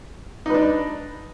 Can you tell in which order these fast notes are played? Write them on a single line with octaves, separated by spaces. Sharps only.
D#4 B4 D4